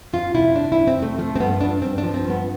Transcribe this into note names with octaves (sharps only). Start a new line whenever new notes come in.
F2 F4
C3 E4
C3 D4
C3 E4
C4
F2
A3
F3 A3
C4
G2 B3
G2 D4
G2 C4
D4
F3
C4
G2
B3